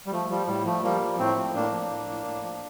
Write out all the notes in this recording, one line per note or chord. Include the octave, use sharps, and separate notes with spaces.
G3
F3 A3
F3 G3
A2 G3
F3 A3
F3 G3 A#3
F3
A2 A3 C4
F3
A2 A#3 D4
F3
A2
A2
A2
F3